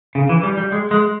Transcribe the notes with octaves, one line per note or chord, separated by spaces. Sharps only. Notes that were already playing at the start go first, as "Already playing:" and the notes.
C#3
E3
G3
G3
G#3
G#3